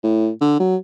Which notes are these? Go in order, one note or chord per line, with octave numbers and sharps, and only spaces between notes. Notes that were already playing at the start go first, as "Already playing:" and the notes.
A2
D3
F#3